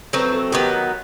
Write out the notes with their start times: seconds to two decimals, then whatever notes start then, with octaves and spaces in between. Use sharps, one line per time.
0.13 F#3 A3 C4 B4
0.33 A4
0.52 D#3 F#3 B3 G4